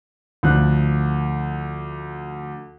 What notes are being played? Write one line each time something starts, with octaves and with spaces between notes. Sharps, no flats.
D2 F3 F#6